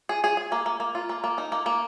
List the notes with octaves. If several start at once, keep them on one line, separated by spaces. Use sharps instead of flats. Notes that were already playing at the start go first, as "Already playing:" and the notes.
G#4
G#4
G#4
A#3
A#3
A#3
F4
A#3
A#3
D#4
A#3
A#3